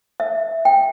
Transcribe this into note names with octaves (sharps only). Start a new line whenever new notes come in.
E5
G5